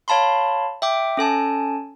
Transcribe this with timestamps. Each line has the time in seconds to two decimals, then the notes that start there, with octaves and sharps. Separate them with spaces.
0.08 C#5 F5 A5 B5 C6
0.82 E5 G5 D6
1.17 C#4 A4 G#5 A5